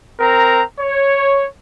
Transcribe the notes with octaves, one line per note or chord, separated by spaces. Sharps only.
C4 A#4 A#5
C#5